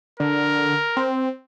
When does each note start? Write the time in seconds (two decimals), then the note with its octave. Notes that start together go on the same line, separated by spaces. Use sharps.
0.20 D3 A#4
0.97 C4